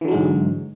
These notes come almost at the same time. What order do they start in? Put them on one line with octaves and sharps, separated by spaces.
E3 D3 F#3 G#3 G#2